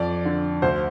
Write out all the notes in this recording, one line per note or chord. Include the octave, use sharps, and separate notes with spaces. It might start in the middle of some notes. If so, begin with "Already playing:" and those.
Already playing: F2 D5
D3
D2 C5